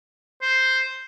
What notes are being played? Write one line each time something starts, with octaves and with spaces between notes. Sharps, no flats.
C5